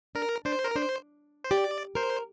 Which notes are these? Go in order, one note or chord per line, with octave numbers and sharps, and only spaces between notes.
D4 A#4
D4 C5
A#4
D4 C5
C5
G4 D5
A#4 C5